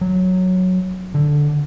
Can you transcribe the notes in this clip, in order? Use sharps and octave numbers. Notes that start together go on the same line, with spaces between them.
F#3
D3